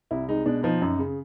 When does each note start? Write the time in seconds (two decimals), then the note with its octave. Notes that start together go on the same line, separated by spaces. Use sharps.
0.11 C2 E4
0.29 G#3 D#4
0.46 B2 D4
0.63 F3 D#4
0.82 F#2
0.99 C#3